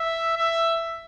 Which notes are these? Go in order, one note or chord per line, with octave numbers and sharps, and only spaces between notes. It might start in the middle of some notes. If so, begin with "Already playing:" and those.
Already playing: E5
E5